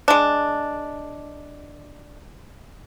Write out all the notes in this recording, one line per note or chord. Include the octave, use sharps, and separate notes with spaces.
G#3 D4